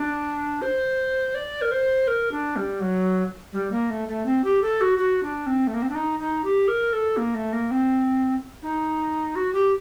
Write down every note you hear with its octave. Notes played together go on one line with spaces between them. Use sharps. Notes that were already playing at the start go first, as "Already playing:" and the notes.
Already playing: D4
C5
D5
A#4
C5
A#4
D4
G3
F#3
G3
A#3
A3
A3
C4
G4
A4
F#4
F#4
D4
C4
A3
A#3
C4
D4
D#4
D#4
G4
A#4
A4
A#3
A3
A#3
C4
D#4
F#4
G4